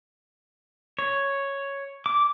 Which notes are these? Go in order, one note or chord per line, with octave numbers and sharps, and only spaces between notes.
C#5
D6